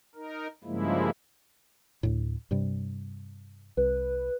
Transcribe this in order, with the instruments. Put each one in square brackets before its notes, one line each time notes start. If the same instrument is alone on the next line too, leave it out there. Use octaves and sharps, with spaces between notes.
[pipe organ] D#4 A#4
G2 C#3 F3 G#3 A#3 E4
[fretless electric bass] D2 A2
G2 C3 G3
[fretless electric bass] C2 [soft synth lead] B4